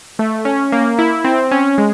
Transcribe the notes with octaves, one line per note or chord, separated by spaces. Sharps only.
A3
C#4
A#3
E4
C4
C#4
G#3